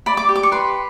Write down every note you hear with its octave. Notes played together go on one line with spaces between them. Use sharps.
D5 B5
D6
G4
D6
C#6
B4 C6